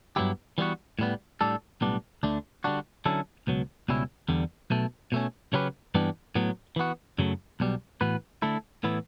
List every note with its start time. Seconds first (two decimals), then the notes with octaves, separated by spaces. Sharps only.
0.16 G2 F#3 B3 E4 G4
0.58 E3 G3 B3 F#4
0.99 A2 G3 B3
1.41 A2 G3 D4 A4
1.81 B1 A2 G3 B3 D4
2.23 D2 D3 A3 D4
2.64 D3 G3 D4 F#4
3.06 D3 F#3 C#4 E4 A4
3.47 C#2 B2 F#3
3.88 C#2 B2 G3 C#4 E4
4.29 E2 D3 G3
4.70 B1 B2 A3
5.12 B2 A3 C#4
5.53 C#3 F#3 C#4 G4 B4
5.95 G2 E3 B3 D4 G4
6.35 A2 F#3 B3
6.76 E3 B3 F#4
7.18 F#2 C#3 F#3 A3
7.60 B1 B2 G3
8.01 A2 E3 B3 F#4 B4
8.42 D3 A3 E4 A4
8.84 A2 E3 B3 E4